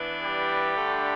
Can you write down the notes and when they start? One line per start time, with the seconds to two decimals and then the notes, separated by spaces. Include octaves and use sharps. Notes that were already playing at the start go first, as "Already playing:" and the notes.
Already playing: E3 B3 D4
0.22 G3 G4
0.76 D3 A3 D4